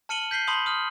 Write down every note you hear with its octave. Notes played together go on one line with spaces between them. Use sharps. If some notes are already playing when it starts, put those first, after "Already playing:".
A5 F6 C#7 D#7 F#7 G7
G6 B6 C7 G7
A5 B5 C6 D#6 F#7 G7
D#6 F6